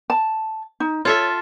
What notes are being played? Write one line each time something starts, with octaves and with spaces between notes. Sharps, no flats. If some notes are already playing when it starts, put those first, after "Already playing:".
A5
D#4
F4 A4 C#5 E5